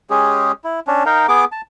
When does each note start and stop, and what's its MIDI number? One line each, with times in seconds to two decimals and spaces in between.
0.10 0.52 56
0.10 0.52 61
0.10 0.52 67
0.10 0.52 68
0.64 0.80 64
0.87 1.04 61
0.87 1.04 62
1.06 1.27 63
1.06 1.27 70
1.06 1.27 77
1.06 1.27 79
1.28 1.45 59
1.28 1.45 68
1.28 1.45 86
1.52 1.61 81